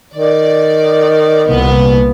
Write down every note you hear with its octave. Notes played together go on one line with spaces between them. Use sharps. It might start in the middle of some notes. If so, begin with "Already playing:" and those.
D#3 D5
C2 A#2 B3